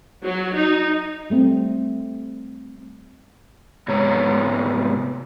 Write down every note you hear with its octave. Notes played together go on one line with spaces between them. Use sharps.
F#3
D#4
G3 A3 C4
G#2 C3 G#3 B3 C#5 A#5